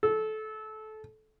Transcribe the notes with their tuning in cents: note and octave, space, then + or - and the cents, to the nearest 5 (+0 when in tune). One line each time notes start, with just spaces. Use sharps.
A4 -20